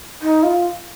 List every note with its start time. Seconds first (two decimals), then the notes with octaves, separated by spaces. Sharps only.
0.22 D#4
0.43 F4